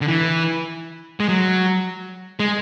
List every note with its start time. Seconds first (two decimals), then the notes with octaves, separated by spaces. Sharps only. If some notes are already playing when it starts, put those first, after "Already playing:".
0.01 D3
0.06 E3
1.20 G#3
1.29 F#3
2.40 G#3